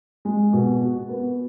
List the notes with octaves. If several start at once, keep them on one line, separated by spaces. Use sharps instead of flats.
G#3
B2
F#4
B3